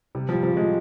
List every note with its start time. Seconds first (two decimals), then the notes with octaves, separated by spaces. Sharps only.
0.15 C3 G3
0.29 F3 G3
0.43 F3
0.52 C3 G#3